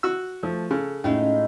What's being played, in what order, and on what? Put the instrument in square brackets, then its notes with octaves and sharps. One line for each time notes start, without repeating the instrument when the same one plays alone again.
[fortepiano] F#4 E6
[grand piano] F3 A3
[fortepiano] C#3 [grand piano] A4
[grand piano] A2 [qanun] G#3 D#4 F4 [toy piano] C#4